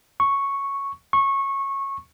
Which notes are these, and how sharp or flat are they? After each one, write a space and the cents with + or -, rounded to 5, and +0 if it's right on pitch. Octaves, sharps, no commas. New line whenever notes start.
C#6 -5
C#6 -20